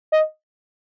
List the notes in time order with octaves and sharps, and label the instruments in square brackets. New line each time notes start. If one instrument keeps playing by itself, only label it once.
[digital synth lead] D#5